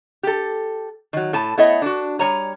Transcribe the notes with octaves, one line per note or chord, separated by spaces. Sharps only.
G4 A4
D#3 F#3
A2 A5
A3 B3 E4 C#5 D#5
D4 F#4
G3 C#5 A#5